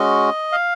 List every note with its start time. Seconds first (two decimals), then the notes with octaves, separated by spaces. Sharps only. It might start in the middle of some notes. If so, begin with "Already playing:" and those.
Already playing: G#3 C#4 F#4 D#5
0.52 F5